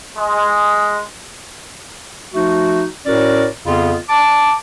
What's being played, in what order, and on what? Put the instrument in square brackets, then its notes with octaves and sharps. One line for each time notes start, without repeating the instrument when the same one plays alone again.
[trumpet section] G#3
[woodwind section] F3 A3 D#4 F#4
A2 C#4 F#4 A#4 D5
F2 C#3 B3 F4
A5 D6